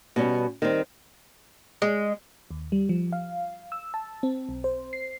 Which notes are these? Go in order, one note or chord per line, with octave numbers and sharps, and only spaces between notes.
B2 G3 C#4
D#3 G3 C4
G#3
D#2
G3
F3
F5
E6
A5
C4
B1
C5
C7